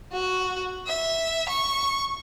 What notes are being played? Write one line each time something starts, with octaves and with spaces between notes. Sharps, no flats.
F#4
E5
C#6